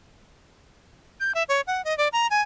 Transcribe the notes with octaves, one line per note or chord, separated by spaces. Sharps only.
G6
E5
C#5
F#5
D#5
D5
A#5
G#5